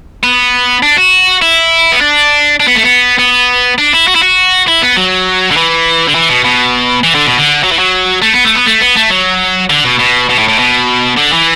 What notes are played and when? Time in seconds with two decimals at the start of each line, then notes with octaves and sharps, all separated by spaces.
0.23 B3
0.83 D4
0.97 F#4
1.42 E4
1.92 B3
2.01 D4
2.60 D4
2.68 B3
2.76 A3
2.84 B3
3.19 B3
3.78 D4
3.93 E4
4.08 F#4
4.16 E4
4.23 F#4
4.67 E4
4.82 B3
4.96 F#3
5.51 D3
5.56 E3
6.08 D3
6.15 E3
6.29 B2
6.45 B2
7.04 E3
7.15 D3
7.26 B2
7.37 D3
7.63 F#3
7.71 E3
7.79 F#3
8.22 A3
8.33 B3
8.45 A3
8.55 B3
8.66 A3
8.81 B3
8.96 A3
9.11 F#3
9.70 D3
9.85 B2
9.99 B2
10.29 B2
10.38 A2
10.49 A2
10.59 B2
11.18 D3
11.33 E3